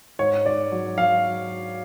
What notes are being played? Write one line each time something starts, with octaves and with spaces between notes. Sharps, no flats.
G#2 C#5
G#2 D5
F#3
F#3 F5